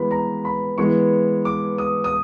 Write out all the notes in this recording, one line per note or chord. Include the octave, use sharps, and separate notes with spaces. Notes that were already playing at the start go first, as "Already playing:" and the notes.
Already playing: E3 G#3 B3 B5
A#5
B5
E3 G#3 B3 C#6
D6
D#6
D#6